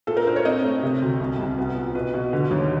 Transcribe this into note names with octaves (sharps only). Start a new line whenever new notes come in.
A#2 A4
A#4
D4 C5
C#5
C4 D#5
A3
C3
D2
C2
C2
B3
A#2
B2 B4
B2
D3
D#2